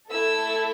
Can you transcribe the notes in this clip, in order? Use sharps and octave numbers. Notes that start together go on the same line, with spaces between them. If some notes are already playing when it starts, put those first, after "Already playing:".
A3 E4 A4 E6